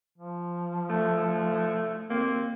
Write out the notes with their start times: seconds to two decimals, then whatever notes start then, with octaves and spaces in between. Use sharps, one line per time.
0.18 F3
0.90 A3
2.10 A#3 C4